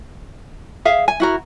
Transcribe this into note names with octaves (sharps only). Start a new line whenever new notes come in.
G#4 E5 F5
G#5
E4 F#4 A#4